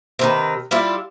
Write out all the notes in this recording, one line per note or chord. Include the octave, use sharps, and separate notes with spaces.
C3 D#3 B4
G3 E4 F4 D5